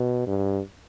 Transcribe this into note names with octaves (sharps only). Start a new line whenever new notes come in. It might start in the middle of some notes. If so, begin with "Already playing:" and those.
Already playing: B2
G2